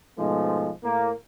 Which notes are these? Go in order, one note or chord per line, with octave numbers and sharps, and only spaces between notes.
G#2 B2 F3 G#3 A3
A2 A#3